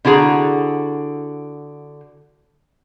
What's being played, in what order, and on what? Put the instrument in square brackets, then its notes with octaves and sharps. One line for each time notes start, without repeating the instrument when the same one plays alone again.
[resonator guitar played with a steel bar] D3 E4 F#4 G#4 A#5